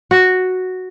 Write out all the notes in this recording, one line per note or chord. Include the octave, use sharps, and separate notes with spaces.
F#4